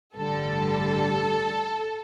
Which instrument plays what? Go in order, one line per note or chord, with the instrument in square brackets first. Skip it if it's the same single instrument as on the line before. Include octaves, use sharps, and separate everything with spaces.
[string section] A1 G2 D3 G3 A4